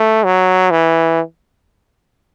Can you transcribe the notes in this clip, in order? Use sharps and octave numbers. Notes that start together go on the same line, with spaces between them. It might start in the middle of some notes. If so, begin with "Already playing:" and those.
Already playing: A3
F#3
E3